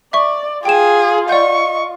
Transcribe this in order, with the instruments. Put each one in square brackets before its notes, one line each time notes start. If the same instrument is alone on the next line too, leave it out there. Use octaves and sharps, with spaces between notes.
[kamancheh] D5 [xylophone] E5 C#6
[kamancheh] F4 [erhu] G#4 [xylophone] G5 E7
[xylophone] D5 F#5 G6 [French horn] D#5 [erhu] C#6